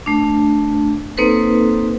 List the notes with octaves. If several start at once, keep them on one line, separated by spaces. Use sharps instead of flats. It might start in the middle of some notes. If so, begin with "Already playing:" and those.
A3 D4
A#3 C4 D#4 A4 B4 C5